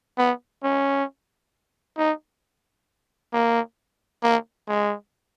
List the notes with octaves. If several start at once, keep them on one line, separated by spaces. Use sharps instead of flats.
B3
C#4
D#4
A#3
A#3
G#3